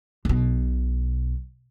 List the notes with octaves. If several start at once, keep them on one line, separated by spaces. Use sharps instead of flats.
B1 B2